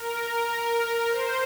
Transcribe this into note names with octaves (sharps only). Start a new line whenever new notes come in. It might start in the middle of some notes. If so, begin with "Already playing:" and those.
Already playing: A#4
A#4
C5